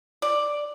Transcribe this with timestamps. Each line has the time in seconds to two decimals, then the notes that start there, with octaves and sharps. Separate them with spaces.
0.22 D5